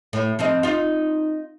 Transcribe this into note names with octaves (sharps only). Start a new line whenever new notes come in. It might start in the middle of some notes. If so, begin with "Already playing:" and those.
A2
F3 C4 D#5
D#4 F4